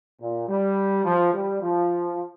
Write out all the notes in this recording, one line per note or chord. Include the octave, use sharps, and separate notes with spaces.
A#2
G3
F3
G3
F3